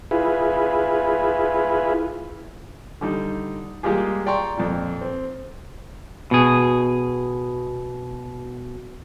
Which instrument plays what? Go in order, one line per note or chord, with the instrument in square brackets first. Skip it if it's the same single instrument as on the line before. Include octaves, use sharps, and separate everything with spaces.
[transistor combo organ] E4 F4 G#4 B4
[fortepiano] D3 G3 D#4
G3 G#3 A#3 F4 G4 G#4
D5 G5 A#5 C6 C#6
F2 A#2
C4
[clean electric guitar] B2 G#4